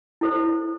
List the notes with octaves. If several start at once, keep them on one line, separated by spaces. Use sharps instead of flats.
E4 A4 C5